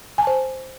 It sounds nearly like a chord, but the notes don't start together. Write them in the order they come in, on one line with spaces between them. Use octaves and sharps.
G#5 A5 C5